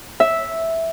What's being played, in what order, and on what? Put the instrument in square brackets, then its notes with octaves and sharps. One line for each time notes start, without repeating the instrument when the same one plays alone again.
[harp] E5